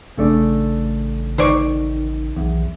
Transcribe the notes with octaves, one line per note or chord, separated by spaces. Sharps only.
A1 C#3 A3 D4
D#3 C5 D5 C#6
B1 E2